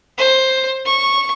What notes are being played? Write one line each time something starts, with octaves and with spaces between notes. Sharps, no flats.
C5
C#6